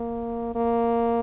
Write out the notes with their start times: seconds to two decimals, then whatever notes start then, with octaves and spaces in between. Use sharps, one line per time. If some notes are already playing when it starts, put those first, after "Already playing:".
Already playing: A#3
0.55 A#3